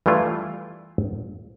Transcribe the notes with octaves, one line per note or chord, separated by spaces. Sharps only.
E3 G3 A3 E4 F4